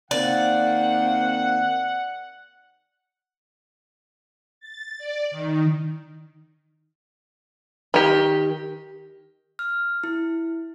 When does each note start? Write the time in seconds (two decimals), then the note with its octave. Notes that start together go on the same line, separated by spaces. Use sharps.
0.11 D#3 A#3 C4 D5 F#5
4.60 A6
4.98 D5
5.31 D#3
7.94 D#3 G4
9.59 F6
10.04 E4